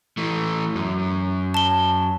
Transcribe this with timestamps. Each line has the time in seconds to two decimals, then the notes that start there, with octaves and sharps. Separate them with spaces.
0.18 E3 A3
0.75 F#2
1.54 A5 G7